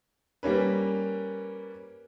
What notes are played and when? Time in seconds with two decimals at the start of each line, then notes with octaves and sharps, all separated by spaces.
0.43 G3 A#3 C#4 B4